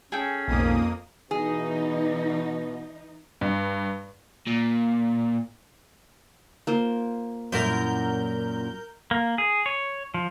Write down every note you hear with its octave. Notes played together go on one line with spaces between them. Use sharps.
C#4 G#4 A4 G5
B1 F2 G#2 A#3 D#6
B2 E3 D#4 G#4
G2
A#2
A#3 F4 C5
F#2 A#2 E4 A#4 G6
A#3
G#4
C#5
F3